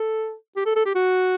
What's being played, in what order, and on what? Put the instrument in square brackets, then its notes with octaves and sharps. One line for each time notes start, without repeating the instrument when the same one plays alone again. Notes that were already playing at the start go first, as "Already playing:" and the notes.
Already playing: [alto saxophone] A4
G4
A4
A4
G4
F#4